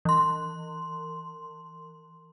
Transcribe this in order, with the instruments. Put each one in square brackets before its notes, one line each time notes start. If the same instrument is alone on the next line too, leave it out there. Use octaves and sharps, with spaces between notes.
[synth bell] E3 C6